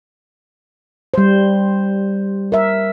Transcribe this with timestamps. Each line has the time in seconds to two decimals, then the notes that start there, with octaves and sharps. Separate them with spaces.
1.14 G3 C5
2.52 A#4 E5